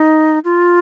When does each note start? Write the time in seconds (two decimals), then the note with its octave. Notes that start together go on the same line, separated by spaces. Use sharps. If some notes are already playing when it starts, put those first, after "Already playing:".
Already playing: D#4
0.44 F4